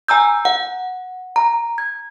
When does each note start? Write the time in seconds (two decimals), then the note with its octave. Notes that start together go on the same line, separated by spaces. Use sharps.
0.08 G#5 A#5 E6 G6
0.45 F#5
1.36 A#5
1.78 G#6